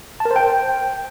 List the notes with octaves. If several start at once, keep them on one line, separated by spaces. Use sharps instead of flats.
A5
A#4
C5
G5